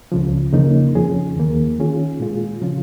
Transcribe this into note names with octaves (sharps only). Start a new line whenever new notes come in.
C#2 C#3 F3
F2 C#3 F3 A#3 D#4
F2 F3 C#4 G#4
D#2 D#3 A#3
D#3 C#4 F4 G#4
A#2 G#3 F4 G#4
C#3 F3 C#4 F4